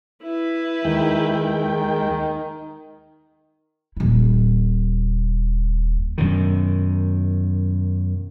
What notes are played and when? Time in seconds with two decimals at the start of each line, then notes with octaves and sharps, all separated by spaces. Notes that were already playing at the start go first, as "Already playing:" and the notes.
0.22 E4 B4
0.85 D#2 D#3 G#3 G5
3.97 D#1 E4
6.18 F#2 B2 D#3